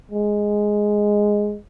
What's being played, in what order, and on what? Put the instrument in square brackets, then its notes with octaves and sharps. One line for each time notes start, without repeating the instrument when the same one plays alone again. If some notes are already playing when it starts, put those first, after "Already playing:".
[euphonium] G#3